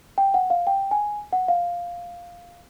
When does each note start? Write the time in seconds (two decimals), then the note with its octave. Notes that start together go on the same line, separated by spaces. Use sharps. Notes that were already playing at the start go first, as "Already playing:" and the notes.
0.18 G5
0.34 F#5
0.50 F5
0.67 G5
0.91 G#5
1.33 F#5
1.48 F5